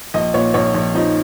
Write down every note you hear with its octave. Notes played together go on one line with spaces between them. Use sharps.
A#1 D#5
A#2 C#5
A#1 C#5
A#1
F3 D#4